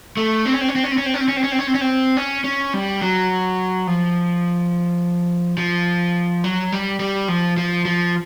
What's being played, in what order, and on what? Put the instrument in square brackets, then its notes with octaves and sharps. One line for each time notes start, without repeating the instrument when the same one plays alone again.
[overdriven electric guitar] A3
C4
C#4
C4
C#4
C4
C#4
C4
C#4
C4
C#4
C4
C#4
C4
C#4
C4
C#4
C4
C#4
C4
C#4
C#4
G3
F#3
F3
F3
F#3
G3
G3
F3
F3
F3